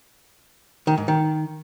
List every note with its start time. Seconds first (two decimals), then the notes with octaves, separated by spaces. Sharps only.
0.87 D#3
0.98 G#2
1.08 D#3